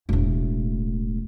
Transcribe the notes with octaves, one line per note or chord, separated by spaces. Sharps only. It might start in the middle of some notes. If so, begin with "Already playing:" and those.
E1 A2